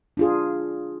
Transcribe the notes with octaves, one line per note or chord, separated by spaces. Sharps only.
D4 F4 G#4